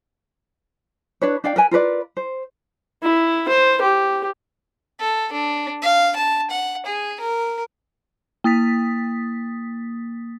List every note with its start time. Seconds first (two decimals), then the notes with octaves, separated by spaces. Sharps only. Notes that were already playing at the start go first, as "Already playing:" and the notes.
1.22 D4 B4 C#5
1.44 D4 D5 F5 G5
1.56 A#4 B4 G#5
1.71 F4 A#4 B4 D5
2.17 C5
3.03 E4
3.49 C5
3.82 G4
5.00 A4
5.32 D4
5.82 F5
6.16 A5
6.50 F#5
6.86 G#4
7.20 A#4
8.44 A#3 D#6 A6 B6